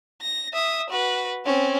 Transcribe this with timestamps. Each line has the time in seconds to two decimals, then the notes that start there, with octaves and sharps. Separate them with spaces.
0.22 A#6
0.53 E5 D#6
0.90 F#4 B4
1.45 C4 C#4